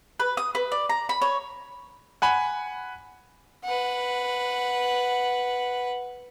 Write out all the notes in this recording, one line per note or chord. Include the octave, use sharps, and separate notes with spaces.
B4
D#6
B4
D5
A#5
B5
C#5
F#5 G#5 B5
B4 F#5